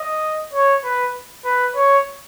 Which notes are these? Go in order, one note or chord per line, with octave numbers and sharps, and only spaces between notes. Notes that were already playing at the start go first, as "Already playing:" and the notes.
Already playing: D#5
C#5
B4
B4
C#5